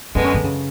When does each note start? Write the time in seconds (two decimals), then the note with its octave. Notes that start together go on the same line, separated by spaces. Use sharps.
0.15 F#2 D3 G#3 B3 D4
0.24 C#4
0.34 D3
0.44 C#3